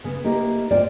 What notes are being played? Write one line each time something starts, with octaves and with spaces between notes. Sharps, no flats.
C#3 B3
A#3 C4 D#4 E4 G4 A#4
D2 G#2 C4 F4 D5